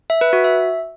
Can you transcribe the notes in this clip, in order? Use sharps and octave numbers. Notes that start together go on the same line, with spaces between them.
E5
B4
F#4
E5